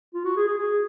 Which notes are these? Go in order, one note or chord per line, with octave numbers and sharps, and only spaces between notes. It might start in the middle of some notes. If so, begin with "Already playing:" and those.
F4
F#4
G#4
G#4
G#4